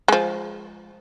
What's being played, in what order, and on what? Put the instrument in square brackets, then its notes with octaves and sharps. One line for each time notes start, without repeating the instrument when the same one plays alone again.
[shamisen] F3 G#3